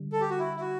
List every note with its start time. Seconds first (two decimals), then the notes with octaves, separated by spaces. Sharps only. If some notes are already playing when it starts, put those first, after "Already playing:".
Already playing: D3 G3
0.12 A4
0.21 G4
0.30 F#4
0.39 E4
0.56 E4
0.60 F#4